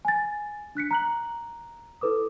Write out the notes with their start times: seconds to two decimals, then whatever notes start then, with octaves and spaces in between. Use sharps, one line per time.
0.05 G#5 A6
0.75 D4 F#6 B6 C#7
0.91 A#5 F#6 F#7
2.01 E4 A4 B4 D6 D#6